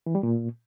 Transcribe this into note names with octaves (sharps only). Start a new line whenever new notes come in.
E3
G3
A#2